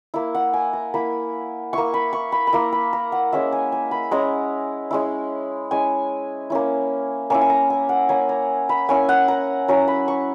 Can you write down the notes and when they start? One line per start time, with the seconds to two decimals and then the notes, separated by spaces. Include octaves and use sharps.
0.14 A#3 E4
0.35 F#5
0.54 G#5
0.73 A#5
0.94 A#3 E4 B5
1.73 A#3 E4 C#6
1.94 B5
2.13 C#6
2.32 B5
2.47 B5
2.53 A#3 E4 A#5
2.72 B5
2.93 A#5
3.12 F#5
3.32 G#3 C#4 E4 E5
3.52 G#5
3.72 G#5
3.91 B5
4.11 G#3 C#4 E4 A#5
4.91 G#3 C#4 E4
5.71 G#3 C#4 E4 G#5
6.50 A#3 C#4 E4
7.30 A#3 C#4 E4 G#5
7.41 G#5
7.50 A#5
7.70 G#5
7.89 F#5
8.09 A#3 C#4 E4 G#5
8.29 A#5
8.69 B5
8.88 A#3 C#4 E4 G#5
9.09 F#5
9.28 A#5
9.68 F#3 C#4 E4 A#5
9.88 B5
10.08 C#6